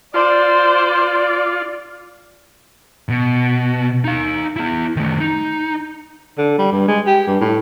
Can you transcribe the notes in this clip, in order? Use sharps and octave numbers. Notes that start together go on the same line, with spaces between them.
F4 C5 D5
B2
D#4 F5
B3 E4
D#3 A3
D#4
D3
G3
G2
G#3
G4
G2
A2